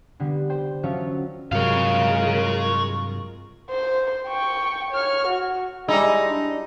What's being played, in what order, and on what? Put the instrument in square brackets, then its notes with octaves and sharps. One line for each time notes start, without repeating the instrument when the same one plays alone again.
[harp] D3 G3 B3
C5 G5
F3 F#3 C#4 F4 C#5 E5
[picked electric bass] G2 C3 F#3 [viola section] G#3 F4 A#4 [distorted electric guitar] C#5 F5
[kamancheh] C5
G5 C#6
C#5 F6
F#4
[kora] G3 E4 [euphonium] G#3 [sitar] D#4
[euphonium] D4